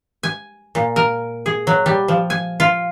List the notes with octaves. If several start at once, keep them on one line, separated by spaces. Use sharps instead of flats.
G#5
A#2
A#4
G#4
F#3
G3
F3
G#5
F4